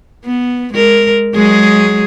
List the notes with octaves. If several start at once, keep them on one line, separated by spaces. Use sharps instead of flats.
B3
G#3 A#4
F#3 G#3 G#4